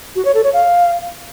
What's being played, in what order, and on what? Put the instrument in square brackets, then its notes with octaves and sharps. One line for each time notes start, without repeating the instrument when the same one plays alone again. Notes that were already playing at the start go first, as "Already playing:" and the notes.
[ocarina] F#4
C#5
A4
C#5
F5